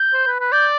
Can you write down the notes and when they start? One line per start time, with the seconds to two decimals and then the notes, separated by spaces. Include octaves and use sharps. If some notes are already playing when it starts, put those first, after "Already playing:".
Already playing: G6
0.14 C5
0.27 B4
0.40 B4
0.52 D5 G6